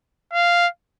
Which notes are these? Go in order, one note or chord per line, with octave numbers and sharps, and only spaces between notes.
F5